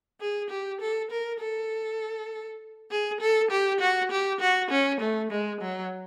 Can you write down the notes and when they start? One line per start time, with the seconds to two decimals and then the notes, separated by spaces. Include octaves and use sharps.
0.21 G#4
0.50 G4
0.81 A4
1.11 A#4
1.41 A4
2.91 G#4
3.21 A4
3.51 G4
3.81 F#4
4.11 G4
4.41 F#4
4.71 C#4
5.00 A3
5.31 G#3
5.61 F#3